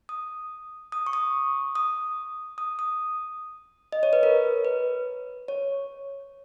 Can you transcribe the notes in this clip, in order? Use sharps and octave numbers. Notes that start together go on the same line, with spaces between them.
D#6
D#6
C#6
D#6
D#6
D#6
D#6
D#5
C#5
B4
A#4
B4
C#5